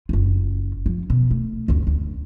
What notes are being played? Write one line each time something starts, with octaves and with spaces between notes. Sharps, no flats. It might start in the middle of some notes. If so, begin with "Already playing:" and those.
F#1 F4
F3
B2
A3
F#1 D2
D2